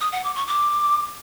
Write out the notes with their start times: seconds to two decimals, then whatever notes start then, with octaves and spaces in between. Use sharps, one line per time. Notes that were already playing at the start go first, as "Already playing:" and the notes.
0.01 D#6
0.12 F#5
0.24 D6
0.36 C#6
0.47 D6